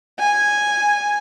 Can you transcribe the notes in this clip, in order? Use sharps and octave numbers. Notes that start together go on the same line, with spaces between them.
G#5